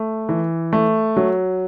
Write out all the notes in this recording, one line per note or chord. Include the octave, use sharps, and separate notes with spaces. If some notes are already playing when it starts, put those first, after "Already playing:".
Already playing: A3
E3
A3
F#3